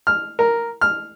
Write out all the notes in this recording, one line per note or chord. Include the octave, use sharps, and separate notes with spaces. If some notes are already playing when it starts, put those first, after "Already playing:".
F6
A#4
F6